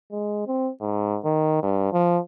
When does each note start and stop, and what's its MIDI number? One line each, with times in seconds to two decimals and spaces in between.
0.12 0.45 56
0.47 0.70 60
0.81 1.18 44
1.25 1.62 51
1.63 1.90 43
1.93 2.19 53